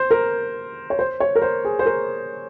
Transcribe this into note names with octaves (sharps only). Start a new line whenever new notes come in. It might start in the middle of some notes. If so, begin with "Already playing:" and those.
Already playing: C5
A#4
C#5
C5
C#5
A#4
C5
G#4
C5
A#4